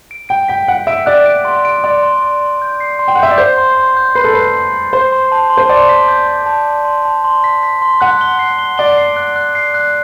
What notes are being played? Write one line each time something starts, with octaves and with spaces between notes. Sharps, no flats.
D7
G5 D7
G5 B6
F#5 D7
E5 D7
D5 F#6
D7
C6
D7
D5 C6
C6
C6
C6
G6
C7
C6
G5
F#5
E5 G6
D5
C5 G6
C6
C6
G6
B4 C7
A4
B4 C7
C6
C6
C5 G6
C6
A5
C6
C5
D5 C6
B6
G6
C6
A5
C6
C6
A5
C6
B6
B6
C6
F#5 F#6
G7
C7
G7
D5 G7
C7
F#6
F#6
C7
F#6